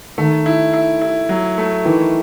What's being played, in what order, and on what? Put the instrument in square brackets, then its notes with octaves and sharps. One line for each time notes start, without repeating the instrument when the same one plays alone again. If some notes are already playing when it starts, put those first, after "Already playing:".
[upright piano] D#3 [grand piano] A3
[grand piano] E4
E4
E4
F#3
A3
[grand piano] D#3 [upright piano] E3